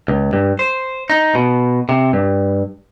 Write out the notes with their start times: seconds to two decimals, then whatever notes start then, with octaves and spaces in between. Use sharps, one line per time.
0.08 C#2
0.33 G2
0.59 C5
1.10 D#4
1.35 B2
1.89 C3
2.13 G2